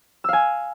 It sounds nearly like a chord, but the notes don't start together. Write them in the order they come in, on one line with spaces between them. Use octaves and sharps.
E6 F5 G#5